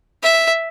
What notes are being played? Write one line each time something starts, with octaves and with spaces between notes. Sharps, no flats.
E5